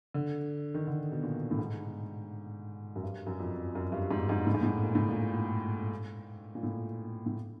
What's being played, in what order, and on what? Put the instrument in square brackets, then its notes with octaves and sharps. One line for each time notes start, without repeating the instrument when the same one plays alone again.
[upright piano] D3
D#3
D3
B2
A#2
A2
G#2
F#2
G2
F#2
F2
F#2
G2
G#2
G#2
A2
G#2
A2
A#2
A2
A#2
A#2
A2
A2